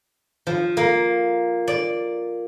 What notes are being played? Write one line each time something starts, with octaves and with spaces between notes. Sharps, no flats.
F3
A#3
D5